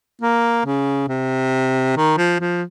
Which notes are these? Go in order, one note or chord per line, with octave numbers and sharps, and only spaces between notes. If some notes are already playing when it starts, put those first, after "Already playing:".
A#3
C#3
C3
D#3
F3
F3